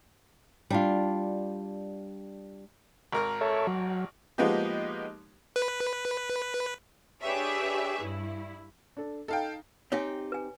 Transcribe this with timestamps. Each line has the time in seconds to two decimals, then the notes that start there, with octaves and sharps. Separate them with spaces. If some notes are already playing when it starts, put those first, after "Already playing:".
0.70 G3 D4 F4
3.12 G#1 A#4 F6
3.41 A4 C#5 E5
3.67 F#3
4.38 F3 G#3 A#3 B3 D#4 G4
5.56 B4
7.22 D4 G4 G#4 B4 C#5 E5
8.01 G2 E4
8.97 D4 A4
9.28 D#4 A4 F5 G5
9.92 C4 D#4 G4 C#5 G#5
10.32 B4 G#5